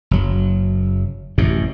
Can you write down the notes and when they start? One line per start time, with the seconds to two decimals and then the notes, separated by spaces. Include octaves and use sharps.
0.11 F#1 F#3
1.38 A1 F#2 C3